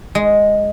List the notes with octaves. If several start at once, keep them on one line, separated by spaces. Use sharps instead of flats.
G#3